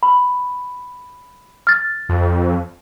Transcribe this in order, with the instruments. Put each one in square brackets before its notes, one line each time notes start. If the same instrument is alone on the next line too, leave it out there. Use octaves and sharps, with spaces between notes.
[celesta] B5
F6 A6
[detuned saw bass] F2